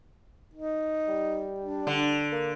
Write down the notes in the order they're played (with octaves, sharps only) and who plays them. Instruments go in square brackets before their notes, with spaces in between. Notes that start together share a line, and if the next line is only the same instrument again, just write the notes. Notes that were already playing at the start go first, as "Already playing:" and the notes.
[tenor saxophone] D#4
[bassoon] G3
[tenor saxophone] D4
[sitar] D3
[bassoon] A#3